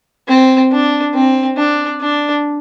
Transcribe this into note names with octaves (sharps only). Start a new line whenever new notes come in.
C4
D4
C4
D4
D4